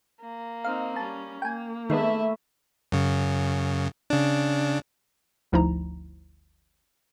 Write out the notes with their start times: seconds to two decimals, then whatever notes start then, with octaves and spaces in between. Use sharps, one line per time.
0.21 A#3
0.64 C4 D#4 F5
0.96 G3 C#4 A5
1.42 A#3 G5 G#5
1.90 D#3 G#3 A3 B3 E4 E5
2.92 F#2 C#3
4.10 C#3 D4
5.52 G1 D2 F3 D#4 E4 A#5